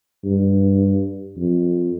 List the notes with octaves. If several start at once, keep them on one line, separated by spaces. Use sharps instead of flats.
G2
F2